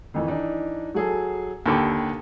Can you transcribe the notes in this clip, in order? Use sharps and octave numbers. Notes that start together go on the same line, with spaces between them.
F2 D#3 E3
E3 D4 D#4
F#3 G#4 A4
D#2 D3 G4 B5